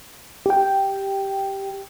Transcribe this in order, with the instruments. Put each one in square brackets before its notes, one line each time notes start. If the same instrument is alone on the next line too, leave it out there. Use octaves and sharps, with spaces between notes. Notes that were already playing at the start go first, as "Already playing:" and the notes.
[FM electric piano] G4 G5